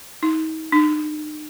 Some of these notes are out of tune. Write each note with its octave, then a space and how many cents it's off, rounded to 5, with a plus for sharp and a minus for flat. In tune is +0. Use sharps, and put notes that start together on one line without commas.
D#4 +35
D#4 -40